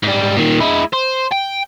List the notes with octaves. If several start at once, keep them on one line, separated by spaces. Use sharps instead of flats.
G#2 G3
A#2 D#3
G#3 E4
C5
G5